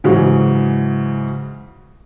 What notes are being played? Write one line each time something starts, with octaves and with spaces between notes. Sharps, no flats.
G#2 C#3 E3 F#3 G#3 F#4